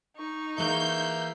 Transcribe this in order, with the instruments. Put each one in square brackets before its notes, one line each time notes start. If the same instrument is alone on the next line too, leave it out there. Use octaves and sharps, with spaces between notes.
[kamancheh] D#4 C#6
[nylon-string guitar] E3 G#3 [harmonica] A#3 E5 [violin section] G6